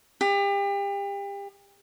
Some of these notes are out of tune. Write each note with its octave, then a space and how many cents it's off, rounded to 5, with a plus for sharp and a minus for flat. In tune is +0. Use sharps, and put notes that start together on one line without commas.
G4 +35